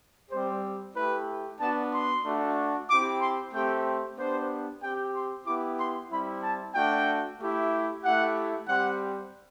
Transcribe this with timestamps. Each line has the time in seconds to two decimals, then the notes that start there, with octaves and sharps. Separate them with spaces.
0.31 G3 C4 G4 C5
0.95 A3 E4 G4 B4
1.59 B3 D4 F#4 A5
1.92 C6
2.23 A3 D4 F#4
2.89 C4 E4 G4 D6
3.20 C6
3.52 A3 C4 G4 G5
4.16 B3 D4 G4 C5
4.82 C4 G4 G5
5.14 C6
5.45 B3 E4 G4 D6
5.78 C6
6.10 G3 C4 E4 B5
6.42 A5
6.74 A3 D4 F#4 G5
7.39 A3 E4 G4
8.02 A3 E4 G4 F#5
8.66 G3 C4 G4 F#5